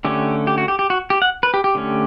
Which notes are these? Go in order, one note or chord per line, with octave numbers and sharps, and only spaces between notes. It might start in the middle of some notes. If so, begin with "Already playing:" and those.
D3 A3 C#4 G4
G4
F#4
G4
G4
F#4
G4
F#5
B4
G4
G4
D3 A3 C#4